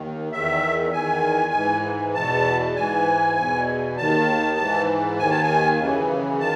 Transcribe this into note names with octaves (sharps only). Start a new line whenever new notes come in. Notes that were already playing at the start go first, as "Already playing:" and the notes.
Already playing: D#2 D#3
E2 D#3 E5
E2 D#3 G#5
G#2 E3
E2 B2 A5
G#2 E3 G#5
E2 B2
D#2 D#3 A5
G#2 E3
D#2 D#3 G#5
A5
G#5
F#2 C#3 E3
D#3 A5